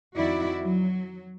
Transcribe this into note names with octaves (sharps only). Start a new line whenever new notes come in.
F2 D#3 E4 F#4 D5
F#3